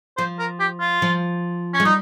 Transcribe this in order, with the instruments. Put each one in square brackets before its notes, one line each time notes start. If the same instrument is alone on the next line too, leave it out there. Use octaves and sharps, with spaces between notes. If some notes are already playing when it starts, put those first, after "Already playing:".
[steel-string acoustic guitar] F3 [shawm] C5
[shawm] A#4
G4
F4
[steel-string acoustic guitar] F3
[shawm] C#4
[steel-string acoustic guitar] G#3
[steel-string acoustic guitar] G3 [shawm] D#4